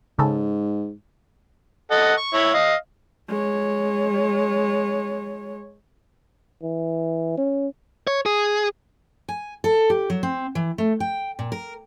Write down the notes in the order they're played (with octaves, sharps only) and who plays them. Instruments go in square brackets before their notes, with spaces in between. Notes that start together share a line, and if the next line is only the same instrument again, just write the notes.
[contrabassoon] G#2 [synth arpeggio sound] C#3 A4
[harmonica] A4 D#5 F#5
C#6
E4 C#5
D#5 F5
[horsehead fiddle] G#3 C#5
[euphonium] E3
C#4
[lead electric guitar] C#5
G#4
[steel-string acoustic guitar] G#5
A4
G4
F#3
C4
E3
A3
G5
A#2
A#4